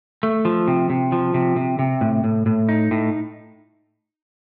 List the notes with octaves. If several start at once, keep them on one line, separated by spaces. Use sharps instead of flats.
A3
F3
C3
C3
F3
C3
C3
C3
A2
A2
A2
D#4
A2